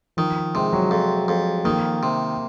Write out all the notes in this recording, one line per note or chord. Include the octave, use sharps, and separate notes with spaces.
D#3 F3
C3 G#3
F#3
F2
F2
D#3 A#3
C3